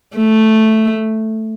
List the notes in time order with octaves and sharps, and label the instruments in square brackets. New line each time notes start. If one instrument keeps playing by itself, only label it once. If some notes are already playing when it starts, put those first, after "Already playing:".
[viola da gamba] A3